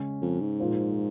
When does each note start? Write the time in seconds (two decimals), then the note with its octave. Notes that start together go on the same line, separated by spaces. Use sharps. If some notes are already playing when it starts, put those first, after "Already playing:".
Already playing: C#3 G#3 C#4
0.22 F2
0.41 G#2
0.60 A#2 F3 A#3 F4 C5